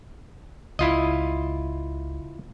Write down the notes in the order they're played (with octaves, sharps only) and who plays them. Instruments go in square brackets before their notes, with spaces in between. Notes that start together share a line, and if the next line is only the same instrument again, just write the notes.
[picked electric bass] C#2 [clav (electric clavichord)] E4 F4 D#5